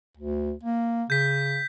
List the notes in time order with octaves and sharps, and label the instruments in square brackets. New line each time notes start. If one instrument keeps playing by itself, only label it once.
[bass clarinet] D2
A#3
[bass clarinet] C#3 [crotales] G6 B6